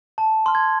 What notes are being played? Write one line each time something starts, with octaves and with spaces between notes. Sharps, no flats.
A5
C6 F6
G#6